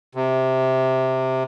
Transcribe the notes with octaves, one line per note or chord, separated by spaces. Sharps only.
C3